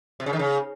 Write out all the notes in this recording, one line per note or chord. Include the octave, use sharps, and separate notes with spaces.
C3
C#3
D#3
C#3